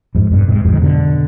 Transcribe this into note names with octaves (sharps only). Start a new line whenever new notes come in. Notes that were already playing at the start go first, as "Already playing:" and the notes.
F2 G#2
G2 B2
G#2 C3
F2 G#2
D#3
B2 D3